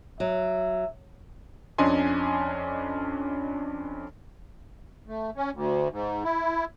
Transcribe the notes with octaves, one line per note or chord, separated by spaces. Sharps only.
F#3 E5
F2 C#4 D4 D#5 G#5 C6
A3
C#4
D2
G#2
E4